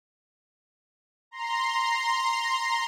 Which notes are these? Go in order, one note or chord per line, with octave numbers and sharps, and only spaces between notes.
A#5 C6